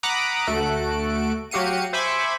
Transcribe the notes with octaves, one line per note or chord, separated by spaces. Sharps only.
F#5 A#5 B5 D6 D#6 F#6
D2 A3 F#4 A4 F#6 D7
F#3 F#4 G4 F5 C#7 D#7
C5 E5 G#5 B5 C#6 D6